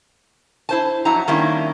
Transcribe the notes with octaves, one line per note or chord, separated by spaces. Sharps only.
E4 C5 A5
F2 F#3 E4 F#5 A#5
D#3 G3 A#3 C#4 D4 E4